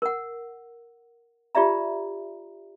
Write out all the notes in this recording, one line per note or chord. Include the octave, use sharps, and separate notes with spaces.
A#4 F#5
F4 G4 D5 E5 A#5